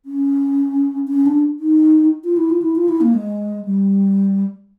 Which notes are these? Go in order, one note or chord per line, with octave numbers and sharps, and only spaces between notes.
C#4
C#4
D4
D#4
F4
E4
F4
E4
F4
E4
A#3
G#3
G3